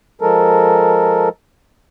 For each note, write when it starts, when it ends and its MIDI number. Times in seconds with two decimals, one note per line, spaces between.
0.21 1.29 53
0.21 1.29 56
0.21 1.29 69
0.21 1.29 70